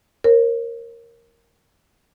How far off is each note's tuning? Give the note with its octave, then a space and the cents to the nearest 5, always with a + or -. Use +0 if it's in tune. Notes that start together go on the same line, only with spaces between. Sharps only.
A#4 +0 C#5 -45